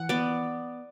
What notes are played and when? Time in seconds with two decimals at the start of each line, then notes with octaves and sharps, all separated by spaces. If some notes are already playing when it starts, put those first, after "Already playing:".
Already playing: E3 F#5
0.09 B3 D5